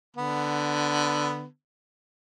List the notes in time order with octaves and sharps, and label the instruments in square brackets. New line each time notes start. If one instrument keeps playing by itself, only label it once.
[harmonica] D3 B3